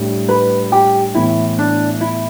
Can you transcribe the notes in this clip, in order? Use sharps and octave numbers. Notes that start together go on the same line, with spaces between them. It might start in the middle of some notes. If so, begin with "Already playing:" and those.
Already playing: A2 G3 D4
B4
G4
A2 E3 B3 E4
D4
E4